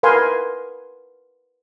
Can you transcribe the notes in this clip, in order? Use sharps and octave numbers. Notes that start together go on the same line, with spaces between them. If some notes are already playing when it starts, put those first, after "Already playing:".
A#4 B4 F5 G#5 C6